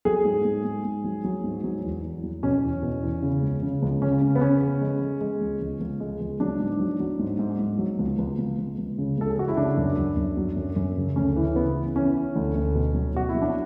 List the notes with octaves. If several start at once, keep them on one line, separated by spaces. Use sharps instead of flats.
F#3 G#4
G#2
G#2
G#2
G#2
F#3
F#3
G#2
F#3
E2
E2
F#3
B2 C#4
E2
B2
E2
C#3
C#2
C#3
C#2
C#3 C#4
C#3
B3
C#3 C#4
C#3
G#3
G#3
G#3
C#2
C#2
C#2
G#3
C#2
F#3 D4
G#2
F#3
F#3
G#2
G#2
G#2
F#3
C#2
C#2
C#2
C#2
C#2
C#3
C#2 A4
G#4
G#3 F#4
E4
C#3 D4
F#2
F#2
F#2
F#3
F#2
F#2
C#3
D2 C#4
E3
C#3 B3
E3
E3 C#4
E3
D2
D2
B2
F#3
B2 F#4
E4
F#3
D4